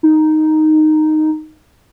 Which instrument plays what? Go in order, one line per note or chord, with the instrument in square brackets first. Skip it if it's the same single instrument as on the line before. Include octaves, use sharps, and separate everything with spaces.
[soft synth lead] D#4